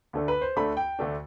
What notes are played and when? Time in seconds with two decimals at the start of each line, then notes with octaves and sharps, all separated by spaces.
0.13 D2 D3 A3 D4
0.28 B4
0.42 C5
0.56 D2 D3 A3 D4 B5
0.77 G5
0.99 D2 D3 A3 D4